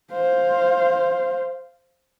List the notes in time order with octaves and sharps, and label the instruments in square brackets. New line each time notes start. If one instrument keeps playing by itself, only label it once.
[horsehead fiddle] C5 F5